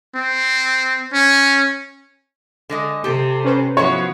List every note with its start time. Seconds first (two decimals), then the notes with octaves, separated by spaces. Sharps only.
0.15 C4
1.13 C#4
2.70 D3 G#3 D#5
3.04 C3 G4 A4
3.44 C#4 B4 C5
3.77 F3 B3 E4 F#4 C#5